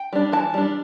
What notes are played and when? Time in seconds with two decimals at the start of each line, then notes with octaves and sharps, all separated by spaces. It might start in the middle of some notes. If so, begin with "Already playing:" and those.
Already playing: G5
0.13 G3 D4
0.32 E3 A5
0.54 G3 D4